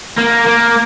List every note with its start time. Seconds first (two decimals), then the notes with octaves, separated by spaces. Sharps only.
0.18 A#3
0.46 A#3